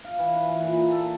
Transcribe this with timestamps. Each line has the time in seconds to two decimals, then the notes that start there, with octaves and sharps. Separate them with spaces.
0.04 F5
0.19 E3
0.36 B4
0.48 E3
0.60 A#2
0.75 A#5
0.91 A4
1.04 A5